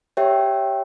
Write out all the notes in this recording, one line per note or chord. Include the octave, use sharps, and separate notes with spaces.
G4 C#5 E5 G5